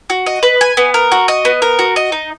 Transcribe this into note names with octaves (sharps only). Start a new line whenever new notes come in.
F#4
D#5
B4
G#5
B3
A#4
F#4
D#5
B3
A#4
F#4
D#5
D#4